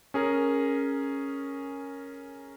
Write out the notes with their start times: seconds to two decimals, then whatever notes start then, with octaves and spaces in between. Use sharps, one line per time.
0.14 C#4 G#4 A#4